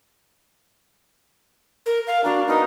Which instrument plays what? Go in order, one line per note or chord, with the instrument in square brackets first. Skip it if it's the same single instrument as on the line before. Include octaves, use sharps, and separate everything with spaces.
[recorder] A#4
F5
[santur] A#3 F#4 A#5 [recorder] D4
[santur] B3 A#4 D#6 [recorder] D#4